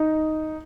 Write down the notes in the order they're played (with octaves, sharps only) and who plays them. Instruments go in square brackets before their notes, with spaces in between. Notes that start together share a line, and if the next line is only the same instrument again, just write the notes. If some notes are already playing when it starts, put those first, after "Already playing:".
Already playing: [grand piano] D#4